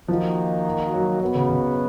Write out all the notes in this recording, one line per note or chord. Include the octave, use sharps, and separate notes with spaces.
D#3 F3 A#3 D#4 F#4
F#3
B2 F#3 B3 F#4
C#3
C#3